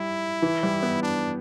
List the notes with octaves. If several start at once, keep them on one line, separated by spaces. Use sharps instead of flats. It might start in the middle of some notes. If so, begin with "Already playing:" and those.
Already playing: G3 E4
E3
G3
B3
D4